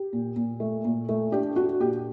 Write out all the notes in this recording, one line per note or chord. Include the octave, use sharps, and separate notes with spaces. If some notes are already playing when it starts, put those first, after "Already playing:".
Already playing: G4
A#2
A#2
A3
A#2
A3
D4 G4
D4 F#4
A#2 G4